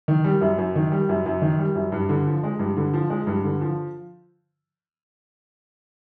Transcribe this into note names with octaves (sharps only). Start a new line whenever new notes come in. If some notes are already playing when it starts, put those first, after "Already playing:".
D#3
G3
F#2
F#2
D#3
G3
F#2
F#2
D#3
G3
F#2
G2
D3
F3
G#3
G2
D3
F3
G#3
G2
D3
F3